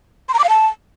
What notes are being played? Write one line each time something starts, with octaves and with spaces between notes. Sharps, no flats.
C6
A#5
D6
F5
A5